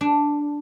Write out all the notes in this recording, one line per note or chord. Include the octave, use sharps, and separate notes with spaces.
D4